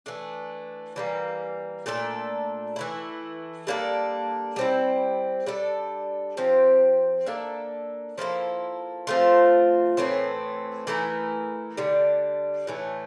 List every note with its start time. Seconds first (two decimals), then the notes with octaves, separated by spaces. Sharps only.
0.06 E3 A3 D4
0.96 E3 G3 A#3
1.86 A#2 A3 D4 A4
2.76 E3 A3 E4
3.67 G3 A#3 D4 A4
4.56 G3 C4 E4
5.46 G3 D4 A4
6.37 F3 C4 G4
7.26 A#3 D4 A4 E5
8.18 F3 A#3 E4 A4
9.07 F3 A3 C4 F4
9.97 A2 E3 A3 C4
10.87 E3 A3 E4 A#4
11.77 D3 G3 D4
12.67 A2 E3 A3